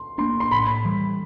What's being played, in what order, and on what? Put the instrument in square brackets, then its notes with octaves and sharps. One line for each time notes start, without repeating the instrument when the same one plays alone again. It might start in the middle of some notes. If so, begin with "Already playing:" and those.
Already playing: [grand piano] C6
[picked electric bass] A#3 D4 [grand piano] C6
[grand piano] C6
[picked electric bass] A2 [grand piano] B5
[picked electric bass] E3 G3